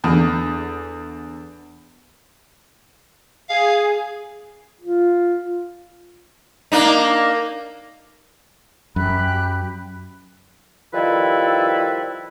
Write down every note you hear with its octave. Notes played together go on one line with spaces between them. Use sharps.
E2 D3
G#4 F5
F4
A#3 D4 D#4
F#2 G4 B5 F#6
D#3 F3 G3 E4 A4 B4